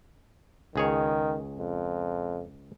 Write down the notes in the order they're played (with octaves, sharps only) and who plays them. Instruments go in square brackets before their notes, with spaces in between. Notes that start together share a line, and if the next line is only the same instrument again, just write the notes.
[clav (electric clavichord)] C#2 G#4 C#5 [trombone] D#3
[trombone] F2